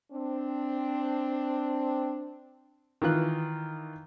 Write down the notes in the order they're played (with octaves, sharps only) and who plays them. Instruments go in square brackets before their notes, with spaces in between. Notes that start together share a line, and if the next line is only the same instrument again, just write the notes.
[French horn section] C4 D4
[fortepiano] D#3 E3 F4 F#6